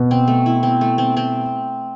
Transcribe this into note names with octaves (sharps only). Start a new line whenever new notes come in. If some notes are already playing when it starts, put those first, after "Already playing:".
Already playing: B2
C4
A3
E4
C4
A3
C4
C4